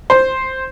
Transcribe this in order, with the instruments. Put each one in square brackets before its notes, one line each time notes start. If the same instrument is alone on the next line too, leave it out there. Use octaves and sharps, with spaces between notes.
[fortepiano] C5